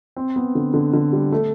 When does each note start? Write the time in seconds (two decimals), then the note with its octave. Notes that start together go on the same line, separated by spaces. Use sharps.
0.16 C4
0.36 B3
0.55 D3
0.74 D3
0.93 D3
1.13 G3
1.32 A3